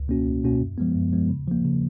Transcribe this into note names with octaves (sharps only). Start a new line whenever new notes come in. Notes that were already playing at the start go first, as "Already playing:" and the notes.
Already playing: C#2
B2 A#3 C#4 F#4
C#2
B2 A#3 C#4 F#4
F#2
F3 G#3 B3
F#2
F3 G#3 B3
C#3
F3 A#3
C#3